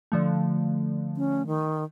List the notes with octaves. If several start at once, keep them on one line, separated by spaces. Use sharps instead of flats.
D3 F3 A3
C#4
D#3